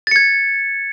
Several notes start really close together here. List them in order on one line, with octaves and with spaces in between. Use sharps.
A6 C#7 G#6